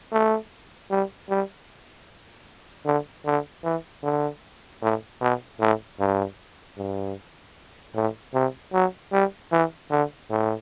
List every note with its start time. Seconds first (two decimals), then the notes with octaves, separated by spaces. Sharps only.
0.12 A3
0.91 G3
1.30 G3
2.86 D3
3.26 D3
3.64 E3
4.03 D3
4.82 A2
5.21 B2
5.60 A2
6.00 G2
6.78 G2
7.95 A2
8.34 C3
8.73 F#3
9.12 G3
9.52 E3
9.91 D3
10.30 A2